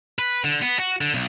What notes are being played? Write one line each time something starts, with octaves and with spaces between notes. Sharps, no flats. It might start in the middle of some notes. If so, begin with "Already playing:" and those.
B4
D3
B3
F#4
D3
B1